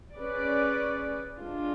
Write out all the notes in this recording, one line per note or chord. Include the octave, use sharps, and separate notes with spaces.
C#4 G#4 B4 D5
G#3 D4 F4